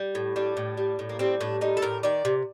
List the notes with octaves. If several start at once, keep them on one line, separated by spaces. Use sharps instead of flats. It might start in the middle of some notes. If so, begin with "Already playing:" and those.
Already playing: G3
A2
G3 D4
A2
G3
A2
A#3
G3 C4
A2 D4
G3 D#4
A4
A2 A#4
D#3 D5
C3